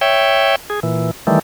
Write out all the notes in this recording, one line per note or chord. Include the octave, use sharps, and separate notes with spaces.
C#5 E5 G5
G#4
A#2 E3
D#3 E3 G3 A3